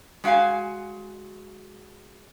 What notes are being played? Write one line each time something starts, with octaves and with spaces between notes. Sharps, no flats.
G#3 F#4 E5 F5 G#5